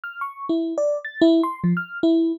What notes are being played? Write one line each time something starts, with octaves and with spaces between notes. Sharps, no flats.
F6
C#6
E4
D5
A6
E4
C6
F3
F6
E4